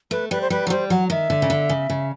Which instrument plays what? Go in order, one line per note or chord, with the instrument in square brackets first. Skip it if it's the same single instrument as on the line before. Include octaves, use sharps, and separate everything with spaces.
[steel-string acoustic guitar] A3 [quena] B4
[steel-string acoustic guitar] G3 [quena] B4
[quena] C5
[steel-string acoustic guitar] G3 [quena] B4
[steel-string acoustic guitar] F#3
[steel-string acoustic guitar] G3 [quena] C5
[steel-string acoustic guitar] F#3 [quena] F#5
[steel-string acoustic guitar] D#3 [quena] E5
[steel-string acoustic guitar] D3
C#3
D3
C#3
C#3